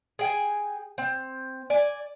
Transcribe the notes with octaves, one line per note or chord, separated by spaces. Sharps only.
G#4 G5 G#5
C4
D5 G#5